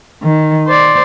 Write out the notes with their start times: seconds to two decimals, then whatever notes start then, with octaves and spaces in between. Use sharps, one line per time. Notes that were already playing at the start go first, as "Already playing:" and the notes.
0.23 D#3
0.68 C5 D5